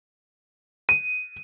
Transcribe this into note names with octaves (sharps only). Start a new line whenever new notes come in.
D#7